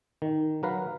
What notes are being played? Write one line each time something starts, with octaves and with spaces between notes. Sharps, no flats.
D#3
F#3 A#4 B4 F5